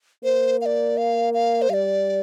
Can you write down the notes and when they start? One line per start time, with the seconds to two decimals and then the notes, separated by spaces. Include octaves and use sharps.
0.24 A#3 C5
0.61 F5
0.66 D5
0.97 F5
1.34 F5
1.62 C5
1.70 G3 D5 F5